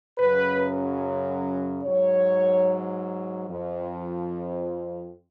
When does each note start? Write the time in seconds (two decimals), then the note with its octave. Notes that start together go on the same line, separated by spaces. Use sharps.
0.18 F#2 C#3 F#3 B4
1.82 G#2 F#3 C#5
3.47 F2 F3